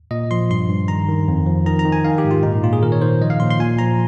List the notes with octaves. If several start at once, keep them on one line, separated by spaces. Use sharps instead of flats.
A#2 D#5
F3 C6
G2 C6
G2
D#3 A#5
D#3
F2
F3
D#3 A#5
A#5
D#3
G#5
D#3 F5
G4
G#2
F4
A#2 D#4
A#2 F4
G#4
D#3 A#4
C#5
D#3 C5
F3 D#5
F5
A#2 C6
C6
A#2 G#5
F3 A#5